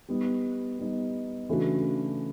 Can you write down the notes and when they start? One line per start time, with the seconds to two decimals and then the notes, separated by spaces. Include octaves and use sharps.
0.08 G3 B3 D#4
0.79 G3 B3 D#4
1.49 C#3 E3 A3 D4 F#4